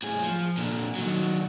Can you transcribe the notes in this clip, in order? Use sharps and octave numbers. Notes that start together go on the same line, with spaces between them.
A2 G#4
F3
A#2 D3
D#3 F#3